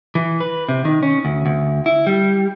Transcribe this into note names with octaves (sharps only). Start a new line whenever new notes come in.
E3
B4
C3
D#3
C#4
D2
D2
E4
G3